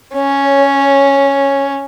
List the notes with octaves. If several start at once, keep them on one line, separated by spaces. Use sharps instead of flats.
C#4 C#5